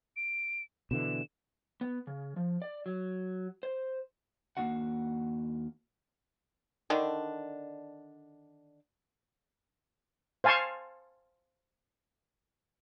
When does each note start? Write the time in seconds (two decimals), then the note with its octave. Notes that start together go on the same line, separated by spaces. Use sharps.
0.17 D7
0.91 B2 D3 E3 E7
1.81 B3
2.07 C#3
2.36 F3
2.62 D5
2.86 F#3
3.63 C5
4.57 D#2 G#2 A#3 D4 F#4 F#5
6.90 D3 D#3 D4
10.44 C5 F5 G#5 A5 C6 C#6